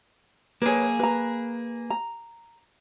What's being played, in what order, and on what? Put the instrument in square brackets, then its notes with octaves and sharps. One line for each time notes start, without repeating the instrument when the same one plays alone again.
[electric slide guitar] A#3 G#4 [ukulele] B4 C#5
[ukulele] B4 A#5
A#5